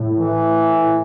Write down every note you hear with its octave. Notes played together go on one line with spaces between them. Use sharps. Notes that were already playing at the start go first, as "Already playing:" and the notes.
Already playing: A2
E3